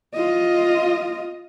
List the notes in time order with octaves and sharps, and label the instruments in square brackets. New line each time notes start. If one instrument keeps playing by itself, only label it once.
[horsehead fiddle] F4 D#5